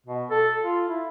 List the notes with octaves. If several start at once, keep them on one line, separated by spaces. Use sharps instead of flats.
B2
A4
F4
E4